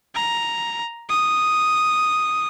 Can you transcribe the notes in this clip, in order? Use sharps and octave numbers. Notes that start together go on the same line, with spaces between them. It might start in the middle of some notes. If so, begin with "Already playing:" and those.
A#5
D#6